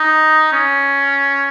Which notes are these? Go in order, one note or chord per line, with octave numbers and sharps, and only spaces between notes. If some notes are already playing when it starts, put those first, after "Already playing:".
Already playing: D#4
C#4